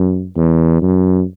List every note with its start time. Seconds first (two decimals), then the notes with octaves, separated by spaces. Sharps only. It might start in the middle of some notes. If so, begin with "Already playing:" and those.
Already playing: F#2
0.37 E2
0.82 F#2